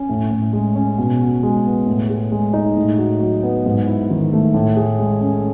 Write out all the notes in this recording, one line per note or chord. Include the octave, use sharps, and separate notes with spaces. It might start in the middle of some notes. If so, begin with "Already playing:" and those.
Already playing: C#4
A2
A2
G#3
C#4
B2
F#4
G#3
B3
A2
G#4
G#3
D#4
A2
F#4
F#3
B3
G#2
E4
D#3
A3
A2
G#4
G#3
C#4